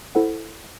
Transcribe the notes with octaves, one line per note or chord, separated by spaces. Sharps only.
E4 A4 C5 F#5